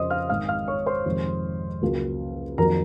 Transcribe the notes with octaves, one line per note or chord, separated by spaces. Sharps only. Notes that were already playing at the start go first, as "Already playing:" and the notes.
Already playing: F2 C#3 F3 C5 D#5 C6 D#6
F5 F6
G#1 G#2 D#3 F5 F6
F5 F6
C#5 C#6
C5 C6
F2 C3 D#3 G#3
C#2 C#3 F#3 A#3
F2 D#3 F#3 A#3 A#4 A#5